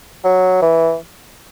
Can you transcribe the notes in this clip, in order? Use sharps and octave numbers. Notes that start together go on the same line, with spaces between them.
F#3
E3